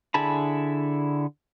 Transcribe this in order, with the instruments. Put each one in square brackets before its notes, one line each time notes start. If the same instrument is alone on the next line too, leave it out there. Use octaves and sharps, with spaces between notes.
[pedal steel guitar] D3 E4 G#4 A5 B5